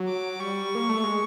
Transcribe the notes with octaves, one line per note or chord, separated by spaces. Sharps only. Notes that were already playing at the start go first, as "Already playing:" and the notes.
Already playing: F#3
D6
G3 C#6
A#3
A3
G#3